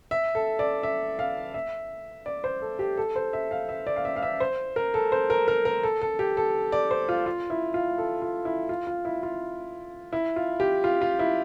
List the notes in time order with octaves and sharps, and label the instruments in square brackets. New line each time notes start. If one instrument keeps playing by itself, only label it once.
[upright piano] E5
A4
D5
E5
F5
E5
D5
C5
A4
G4
A4
C5
E5
F5
E5
D5
F5
E5
F5
E5
C5
A#4
A4
C5
A#4
A#4
A#4
A4
A4
G4
A4
D5
C5
F4
F4
E4
F4
A4
F4
E4
F4
F4
E4
F4
E4
F4
G4
F4
F4
E4